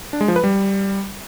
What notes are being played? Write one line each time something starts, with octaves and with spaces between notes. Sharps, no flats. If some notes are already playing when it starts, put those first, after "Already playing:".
D4
G#3
F3
B4
G3